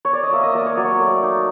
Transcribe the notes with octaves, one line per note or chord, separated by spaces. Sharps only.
C#5
D5
D#5
A#3 E5
D#5
A#3 D5
C#5
F#3 D5
C#5
D5
A3
D#4